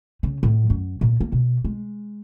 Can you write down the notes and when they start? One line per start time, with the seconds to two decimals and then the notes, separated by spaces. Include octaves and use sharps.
0.23 C#3
0.43 A2
0.70 F#2
1.01 A#2
1.21 A#3
1.32 B2
1.65 G#3